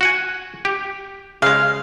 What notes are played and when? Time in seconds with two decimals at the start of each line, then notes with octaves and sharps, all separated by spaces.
0.01 F#4 F#5 G#5
0.65 G4
1.42 C#3 G#3 F5